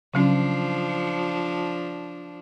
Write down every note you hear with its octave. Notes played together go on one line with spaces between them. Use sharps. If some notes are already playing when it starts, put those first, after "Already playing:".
C#3 F3 F#3 C#4 D4